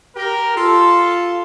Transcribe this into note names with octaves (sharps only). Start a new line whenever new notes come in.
G4 A#4
F4 A4